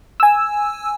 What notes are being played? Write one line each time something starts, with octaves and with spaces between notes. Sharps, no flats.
G#5 E6